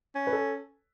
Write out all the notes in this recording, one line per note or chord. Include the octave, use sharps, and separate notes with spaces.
C#4
B4
A4